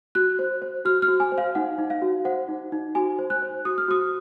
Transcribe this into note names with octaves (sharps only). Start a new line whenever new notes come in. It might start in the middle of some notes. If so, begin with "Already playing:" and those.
F#4 F#6
C5
C5
F#4 F6
F6
F#4
G#5
C5
F5
D#4 F#5
D#4
F5
F#4
C5 F#5
D#4
D#4
F#4 G#5
C5
F#6
C5
F#4 D#6
F6
F#4 D#6